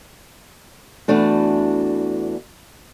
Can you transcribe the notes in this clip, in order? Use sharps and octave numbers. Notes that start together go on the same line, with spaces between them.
E2 E3 A3 D4 F#4